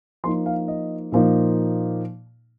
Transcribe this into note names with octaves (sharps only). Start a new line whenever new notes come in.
F3 A#3 D#4 C6
F5
D#5
A#2 F3 A#3 D#4